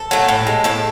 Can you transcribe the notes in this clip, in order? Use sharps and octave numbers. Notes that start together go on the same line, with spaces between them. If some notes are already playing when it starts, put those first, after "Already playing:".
Already playing: A4
F#3 A3
A2
G#3
A2 A4